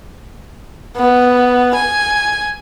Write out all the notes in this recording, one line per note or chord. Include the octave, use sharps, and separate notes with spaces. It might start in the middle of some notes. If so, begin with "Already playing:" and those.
B3
G#5